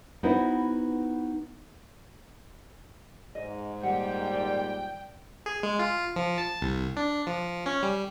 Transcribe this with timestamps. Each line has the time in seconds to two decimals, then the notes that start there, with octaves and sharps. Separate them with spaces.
0.23 B3 D#4 E4 F#4 B4 C5
3.35 G#2 D#5
3.83 A#2 D#3 G3 F#5 G5
4.33 D5
5.46 G#4
5.63 G#3
5.79 F4
6.16 F3
6.38 A5
6.61 C2
6.97 D4
7.27 F3
7.66 C#4
7.83 G3